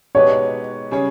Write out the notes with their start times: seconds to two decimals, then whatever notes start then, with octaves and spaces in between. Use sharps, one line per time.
0.15 B2 G#3 D#4 G4 B4 C#5
0.91 C#3 G3 C#4 G#4 C#5